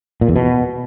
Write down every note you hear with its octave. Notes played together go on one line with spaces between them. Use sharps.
A#2
E2
B2